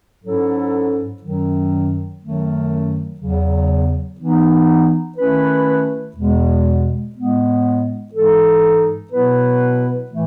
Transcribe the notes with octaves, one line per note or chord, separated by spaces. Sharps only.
G#2 F#3 C#4 E4 A4
F#2 D#3 F#3
F#2 D#3 F#3 A3
E2 C#3 F#3
E3 B3 D#4
D#3 A3 C#4 E4 B4
E2 B2 G#3
A2 G#3 B3
G#2 E3 G#3 D#4 A4
B2 F#3 B3 E4 B4
A2 E3 A3